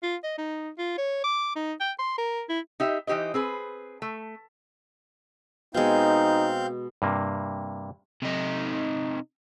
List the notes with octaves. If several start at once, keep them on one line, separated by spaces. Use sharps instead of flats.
F4
D#5
D#4
F4
C#5
D6
D#4
G5
C6
A#4
E4
D#4 G4 E5
E3 D#4 G4 C5 D#5
C4 G#4 B4
A3
B2 G#3 C4 D#4 F5 G6
G2 C3 A#3
C3 D#4